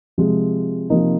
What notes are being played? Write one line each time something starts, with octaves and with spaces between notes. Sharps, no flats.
C3 F3 G#3
C3 F3 A#3 D#4